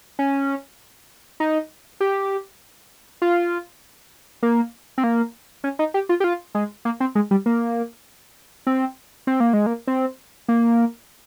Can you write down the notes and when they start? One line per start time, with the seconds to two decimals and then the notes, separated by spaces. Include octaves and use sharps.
0.19 C#4
1.40 D#4
2.00 G4
3.22 F4
4.43 A#3
4.98 C4
5.04 A#3
5.64 C#4
5.79 D#4
5.94 G4
6.09 F4
6.20 G4
6.24 F4
6.55 G#3
6.85 A#3
7.00 C4
7.15 G#3
7.31 G3
7.46 A#3
8.67 C4
9.27 C4
9.40 A#3
9.53 G#3
9.66 A#3
9.87 C4
10.48 A#3